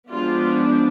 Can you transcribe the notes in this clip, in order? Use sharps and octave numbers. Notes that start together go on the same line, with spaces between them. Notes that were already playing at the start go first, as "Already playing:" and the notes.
F3 G#3 B3 D4 F4